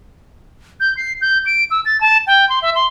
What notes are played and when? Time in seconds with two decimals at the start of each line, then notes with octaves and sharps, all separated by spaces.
0.80 G6
0.97 C7
1.21 G6
1.46 D7
1.71 E6
1.85 A6
2.01 A5
2.27 G5
2.49 C6
2.62 E5
2.75 C6